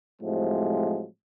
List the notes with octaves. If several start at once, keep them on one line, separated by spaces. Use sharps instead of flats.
A2 C3 F3 F#3 G#3